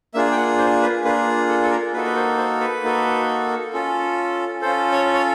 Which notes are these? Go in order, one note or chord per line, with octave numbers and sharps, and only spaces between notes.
A#3 D4 F4 G#4 E5
G5
F#5
C5
B4
A#3 D4 F4 G#4 B4
A4
A4
A#4
A#3 D#4 F#4 A4 B4
B4
C5
C5
B4
A#3 D#4 F#4 A4
C#4 F4 A4
C#4 F4 A4 C5
C#5
C#5